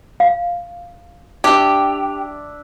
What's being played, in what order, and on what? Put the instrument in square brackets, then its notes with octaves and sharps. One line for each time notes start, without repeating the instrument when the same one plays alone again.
[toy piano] F5
[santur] D4 E5 [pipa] G4